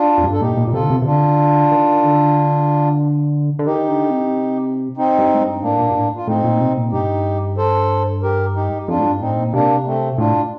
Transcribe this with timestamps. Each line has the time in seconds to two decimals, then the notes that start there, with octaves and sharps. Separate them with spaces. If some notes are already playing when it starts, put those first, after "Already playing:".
Already playing: D4 F4
0.18 F2
0.24 G2
0.33 A4
0.41 A#2 D#4 G4
0.57 A#2
0.67 A#2
0.73 C3 F4 A4
0.82 D3
0.90 C3
1.02 C3
1.05 D3 D4 F4
1.72 D#3
2.03 D3
3.59 D3
3.66 D#3 D#4 G4
3.88 D3
4.10 C3
4.97 C4 D#4
5.18 G2
5.34 A2
5.41 G2
5.62 A2 A#3 D4
5.79 A#2
5.90 G2
5.95 A2
6.16 F4
6.27 A2 C4 D#4
6.44 A#2
6.61 C3
6.77 A#2
6.92 G2 D#4 G4
7.57 A4 C5
8.22 G4 A#4
8.56 D#4 G4
8.88 F2 D4 F4
8.99 A2
9.05 G2
9.21 A2 C4 D#4
9.38 A#2
9.53 C3 A#3 D4
9.86 A3 C4
10.18 A2 D4 F4